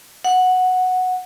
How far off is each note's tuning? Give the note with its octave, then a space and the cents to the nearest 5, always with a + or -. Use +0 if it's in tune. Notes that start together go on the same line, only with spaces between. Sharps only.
F#5 -5